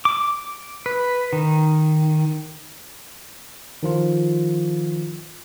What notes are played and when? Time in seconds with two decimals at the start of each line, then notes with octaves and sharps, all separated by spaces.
0.05 D6
0.86 B4
1.33 D#3
3.83 D#3 F3 F4